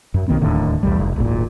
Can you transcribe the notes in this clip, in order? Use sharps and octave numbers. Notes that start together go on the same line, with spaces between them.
F#2
B1 D#3 A#3 C4
D1 D#2 A2 D3
B1 E2 G3
F1
D1 G#1 A#2